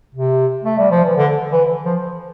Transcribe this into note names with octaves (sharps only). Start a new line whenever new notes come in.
C3
A3
G3
F3
E3
D3
E3
F3